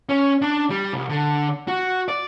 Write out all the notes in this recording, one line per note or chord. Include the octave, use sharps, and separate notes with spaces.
C#4
D4
G3
C2
D3
F#4
D5